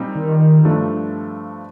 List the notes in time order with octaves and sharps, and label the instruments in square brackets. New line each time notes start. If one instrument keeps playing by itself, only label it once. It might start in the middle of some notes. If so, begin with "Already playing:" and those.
Already playing: [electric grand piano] A#2 G3 C4 D#4
[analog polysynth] D#3
[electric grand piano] G2 F3 A3 D4